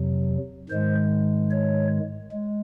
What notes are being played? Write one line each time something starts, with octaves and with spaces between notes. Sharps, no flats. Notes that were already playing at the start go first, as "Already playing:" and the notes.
Already playing: F2 C3 F#3
G#2 D#3 G#3 C5
C#5
G#3